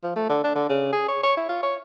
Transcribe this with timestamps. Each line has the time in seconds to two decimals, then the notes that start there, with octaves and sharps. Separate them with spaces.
0.03 F3
0.16 A3
0.29 D3
0.44 D4
0.55 D3
0.69 C#3
0.93 G#4
1.08 C#5
1.23 C#5
1.37 E4
1.49 F4
1.63 C#5